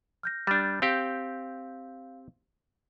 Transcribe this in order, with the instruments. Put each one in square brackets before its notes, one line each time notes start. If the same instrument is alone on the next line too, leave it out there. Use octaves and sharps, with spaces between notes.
[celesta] F6 G6 A#6
[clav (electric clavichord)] G3 D4 [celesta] F6 G6 A6
[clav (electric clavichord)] C4 G4 [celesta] F5